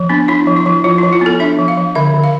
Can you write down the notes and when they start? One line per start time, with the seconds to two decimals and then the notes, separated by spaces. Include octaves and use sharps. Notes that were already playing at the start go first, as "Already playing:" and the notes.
Already playing: F3
0.09 B3 D4
0.28 D4 E4
0.47 F3
0.56 E4
0.66 F3
0.84 F3 F4
0.98 F3 E4
1.13 F4
1.21 B3 A4
1.40 D4 E5
1.59 F3
1.68 F5
1.77 F3
1.95 D3 E5
2.14 D3
2.24 F5